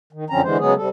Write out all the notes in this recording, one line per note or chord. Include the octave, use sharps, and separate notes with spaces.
D#3
F#2 D3 F3 C4 C#4 A#5
D3 E3 G#3 C5
C#3 F#3 G#3 B3 G#4
C3 G3 A4